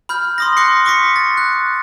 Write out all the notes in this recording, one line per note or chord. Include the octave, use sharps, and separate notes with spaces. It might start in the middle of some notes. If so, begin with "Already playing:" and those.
B5 F6 G6
C6 D#6 A#6
C6 D6 F#6 A#6 C7 C#7
C#6 D6 A#6 B6 C#7
A6
F#6